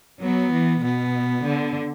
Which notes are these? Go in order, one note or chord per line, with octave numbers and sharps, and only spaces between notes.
F#3 B3
E3
B2 B3
D3